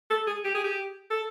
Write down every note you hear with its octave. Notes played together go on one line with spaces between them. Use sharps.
A4
G#4
G4
G#4
G4
A4